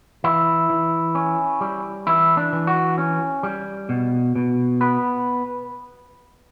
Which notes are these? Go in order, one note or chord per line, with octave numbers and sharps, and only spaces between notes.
E3 E4
E3
C#4
G3
E3 E4
D4
E3
F#4
C#4
G3
B2
B2
B3 B4